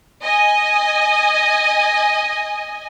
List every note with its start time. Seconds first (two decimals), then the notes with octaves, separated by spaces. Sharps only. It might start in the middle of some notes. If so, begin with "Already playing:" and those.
0.23 D#5 G#5